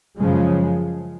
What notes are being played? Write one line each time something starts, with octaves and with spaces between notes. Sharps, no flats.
F#2 C#3 F3 G#3